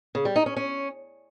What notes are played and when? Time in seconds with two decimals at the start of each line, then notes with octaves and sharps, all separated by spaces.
0.15 C#3
0.25 G3
0.36 D#4
0.46 C#4
0.56 C#4